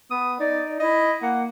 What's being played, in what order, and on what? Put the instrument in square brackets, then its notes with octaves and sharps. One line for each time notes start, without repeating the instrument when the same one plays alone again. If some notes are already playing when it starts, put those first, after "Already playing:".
[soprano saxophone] B3 [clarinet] D#6
[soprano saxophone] D#4 [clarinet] D5
[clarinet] E4 [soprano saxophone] D#5
[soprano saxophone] A#3 [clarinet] F#5